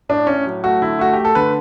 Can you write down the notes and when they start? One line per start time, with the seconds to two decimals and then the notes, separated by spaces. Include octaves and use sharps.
0.09 A2 D4
0.27 A2 C#4
0.46 F#3
0.64 A3 F#4
0.82 D3 E4
0.99 A3 F#4
1.13 A3 G4
1.25 A4
1.35 D3 B4